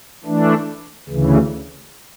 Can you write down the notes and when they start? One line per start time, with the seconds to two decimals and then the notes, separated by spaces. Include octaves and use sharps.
0.24 E3 A3 D4
1.09 D2 C#3 E3